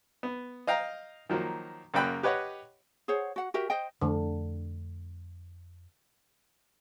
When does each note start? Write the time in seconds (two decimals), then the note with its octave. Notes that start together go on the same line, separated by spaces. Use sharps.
0.23 B3
0.67 D#5 F5 G5 A#5
1.29 D#3 F3 F#3 A#3
1.94 F#2 C#3 A#3 G5 B5 F#6
2.23 G4 B4 C#5 D#5 F#5
3.08 G#4 C5 C#5 F#5
3.36 F#4 F#5
3.54 F#4 G4 A#4 E5
3.70 C5 D#5 G5
4.01 F2 D3 A3